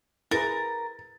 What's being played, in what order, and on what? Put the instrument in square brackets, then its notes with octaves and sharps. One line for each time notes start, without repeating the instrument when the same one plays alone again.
[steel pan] E4 G#4 B4 [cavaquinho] A#4 A#5 [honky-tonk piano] A6